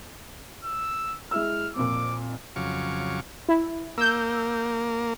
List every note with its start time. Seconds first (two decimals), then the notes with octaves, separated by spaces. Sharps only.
0.64 E6
1.31 G#3 E4 E6 F6
1.76 F2 A#2 D6
2.56 F2 C#3 F#3 F5 C#6 D6
3.49 E4
3.98 A#3 E6 G6